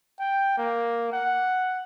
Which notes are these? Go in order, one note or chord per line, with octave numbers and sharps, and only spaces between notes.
G5
A#3
F#5